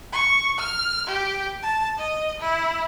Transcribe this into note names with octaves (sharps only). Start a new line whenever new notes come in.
C#6
F6
G4
A5
D#5
E4